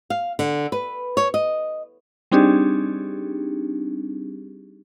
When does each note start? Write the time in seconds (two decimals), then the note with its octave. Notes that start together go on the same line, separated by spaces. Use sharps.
0.10 F5
0.39 D3
0.72 B4
1.17 C#5
1.34 D#5
2.32 G3 C4 D4 D#4 G4 G#4